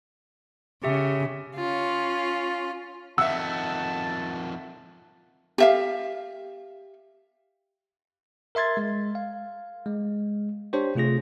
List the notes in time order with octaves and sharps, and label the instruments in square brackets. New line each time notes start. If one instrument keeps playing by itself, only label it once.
[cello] C#3 [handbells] G4 E5
[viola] C#4 F4
[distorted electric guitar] F2 D#3 [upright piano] E5 F#5 [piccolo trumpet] A5 [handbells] E6
[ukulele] G4 E5 F5
[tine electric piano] A#4 E5 C6 G#6 A6
G#3
F5
G#3
D4 G4 C5 C#5
C3 A3 F4 G#4 A#6